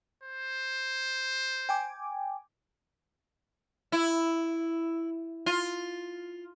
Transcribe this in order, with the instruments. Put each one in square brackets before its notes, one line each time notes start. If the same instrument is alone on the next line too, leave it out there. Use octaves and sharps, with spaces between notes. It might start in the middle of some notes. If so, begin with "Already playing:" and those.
[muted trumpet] C5
[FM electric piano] G5 G#5 D6
[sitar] E4
F4